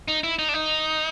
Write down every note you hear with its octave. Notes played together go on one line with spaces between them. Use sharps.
D#4
E4
D#4
D4
D#4